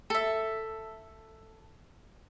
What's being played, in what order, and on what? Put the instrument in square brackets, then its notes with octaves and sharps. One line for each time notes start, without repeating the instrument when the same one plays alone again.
[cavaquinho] A4 E5